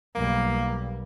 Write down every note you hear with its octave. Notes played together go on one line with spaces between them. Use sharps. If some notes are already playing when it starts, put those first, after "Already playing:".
B1 G3 A#3